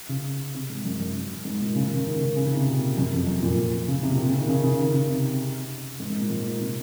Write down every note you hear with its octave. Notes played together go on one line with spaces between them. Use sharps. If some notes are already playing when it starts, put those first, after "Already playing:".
C#3
C3
G#2
F#2
F#2
G#2
A#2
C#3
D#3
C#3
D#3
C#3
C#3
C#3
C3
A#2
F#2
F2
F#2
A#2
C#3
C3
A#2
C3
C#3
D#3
C#3
C#3
D#3
C#3
C3
G#2
G#2
A#2
G#2
A#2
C3